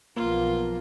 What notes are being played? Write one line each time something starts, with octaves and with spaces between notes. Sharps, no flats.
B1 F3 A#3 B3 F4